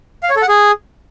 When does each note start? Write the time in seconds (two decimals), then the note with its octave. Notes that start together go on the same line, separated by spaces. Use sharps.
0.23 F5
0.30 C#5
0.36 A4
0.42 F#5
0.48 G#4